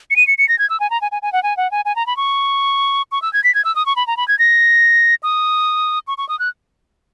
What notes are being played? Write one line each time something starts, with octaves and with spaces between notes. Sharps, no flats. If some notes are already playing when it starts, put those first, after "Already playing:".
C#7
D#7
C#7
C#7
A#6
G#6
E6
G#5
A#5
G#5
G#5
G#5
F#5
G#5
F#5
G#5
G#5
A#5
B5
C#6
C#6
E6
G#6
B6
G#6
E6
D#6
C#6
B5
A#5
B5
G#6
A#6
D#6
C#6
C#6
D#6
F#6